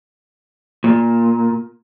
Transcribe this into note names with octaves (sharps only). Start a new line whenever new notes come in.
A#2